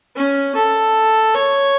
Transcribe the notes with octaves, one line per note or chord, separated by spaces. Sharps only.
C#4
A4
C#5